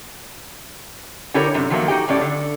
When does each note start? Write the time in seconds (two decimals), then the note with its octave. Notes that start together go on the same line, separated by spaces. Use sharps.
1.34 D3 E4 G4 A4 A#4 C#5
1.54 F#2 C3
1.70 D#3 F3 F#3 A3 A#3
1.88 D#4 F#4 G4 G5
2.08 A2 F#3 C#4 D5
2.21 D3